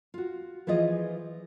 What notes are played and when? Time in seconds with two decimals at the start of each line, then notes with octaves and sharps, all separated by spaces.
0.14 F4 F#4
0.67 E3 F3 E4 F4 G#4 D#5